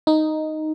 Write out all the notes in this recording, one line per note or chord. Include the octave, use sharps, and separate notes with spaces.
D#4